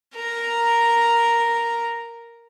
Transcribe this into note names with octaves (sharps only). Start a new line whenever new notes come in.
A#4 A#5